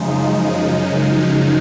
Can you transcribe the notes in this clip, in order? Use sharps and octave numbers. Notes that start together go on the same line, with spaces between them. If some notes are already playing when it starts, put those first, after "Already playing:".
Already playing: F#2 C#3 F3 G#3 D#4